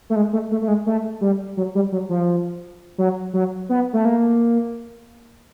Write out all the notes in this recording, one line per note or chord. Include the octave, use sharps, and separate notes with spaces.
A3
G#3
A3
A3
A3
G#3
A3
G3
F#3
G3
F#3
F3
F#3
F#3
B3
A3
A#3